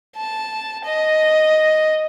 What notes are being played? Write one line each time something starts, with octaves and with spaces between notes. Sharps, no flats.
A5
D#5